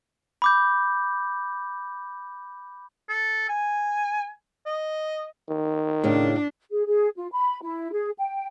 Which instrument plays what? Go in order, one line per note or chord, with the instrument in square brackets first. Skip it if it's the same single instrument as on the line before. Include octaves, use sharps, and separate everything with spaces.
[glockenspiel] B5 D6 G6
[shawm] A4
G#5
D#5
[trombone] D#3
[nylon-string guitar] A2 C#3 [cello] D4
[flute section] G#4
G#4
F4
B5
E4
G#4
G5